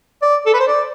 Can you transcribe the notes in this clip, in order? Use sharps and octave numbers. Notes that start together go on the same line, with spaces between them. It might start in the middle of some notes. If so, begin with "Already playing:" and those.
D5
A4
B4
C5
D5